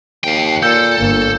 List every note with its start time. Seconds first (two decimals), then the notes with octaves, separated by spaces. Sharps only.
0.24 D#2 F5 G5
0.63 A#2 A4 G6
0.98 G1 A#3